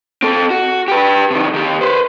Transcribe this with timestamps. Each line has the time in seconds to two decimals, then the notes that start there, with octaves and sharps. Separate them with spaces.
0.23 C4 A4
0.50 F#4
0.88 G4 B4
1.31 C3 D#3
1.54 D#3 G4
1.81 B4 C5